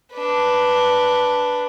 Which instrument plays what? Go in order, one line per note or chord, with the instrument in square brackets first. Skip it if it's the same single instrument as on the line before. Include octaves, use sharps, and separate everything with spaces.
[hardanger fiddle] D4 B4